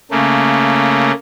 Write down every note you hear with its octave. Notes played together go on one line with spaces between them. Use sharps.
C#3 A3 A#3